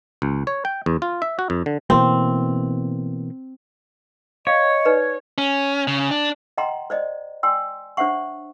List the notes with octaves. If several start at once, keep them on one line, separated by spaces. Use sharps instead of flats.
C#2
C#5
G5
E2
F4
E5
F#4
F2
D3
B2 E3 A#3 C4
C#5 D#5 F5
D#4 B4 D5
C#4
C#3
D4
D#5 F#5 G5 A#5 C6
C5 D5 D#5
D5 G5 G#5 C6 E6
D4 C5 C#5 E5 F#5 C#6